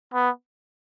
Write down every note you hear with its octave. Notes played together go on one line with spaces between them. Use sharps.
B3